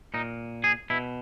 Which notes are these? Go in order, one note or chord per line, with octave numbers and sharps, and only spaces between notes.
A#2 D#4
G#4
B2 E4